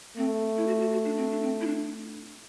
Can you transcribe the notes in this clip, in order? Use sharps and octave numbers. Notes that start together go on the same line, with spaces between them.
A3 C4
E4
F#4
F#4
F#4
D4
C4
D4
C4
E4
D4